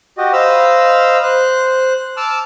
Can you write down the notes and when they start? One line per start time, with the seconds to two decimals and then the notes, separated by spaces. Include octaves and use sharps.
0.18 F#4 G4 D#5
0.33 C5 D#5 F5 B5 E6
1.23 C5 F#6
2.17 A5 D6 E6 F6